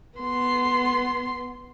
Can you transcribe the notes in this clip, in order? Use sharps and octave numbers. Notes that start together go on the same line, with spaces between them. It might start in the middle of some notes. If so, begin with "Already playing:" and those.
B3 C6